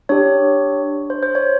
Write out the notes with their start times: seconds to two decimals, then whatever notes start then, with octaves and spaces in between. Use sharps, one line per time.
0.09 D4 G4 C#5
1.10 C5
1.23 C5
1.35 C#5